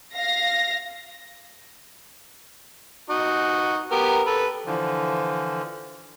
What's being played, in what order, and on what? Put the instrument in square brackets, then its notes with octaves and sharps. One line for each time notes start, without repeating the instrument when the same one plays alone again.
[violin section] F5 A#6
[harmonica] D#4 F#4
B3 G4 A#4
A4 B4
[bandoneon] D3 E3 F3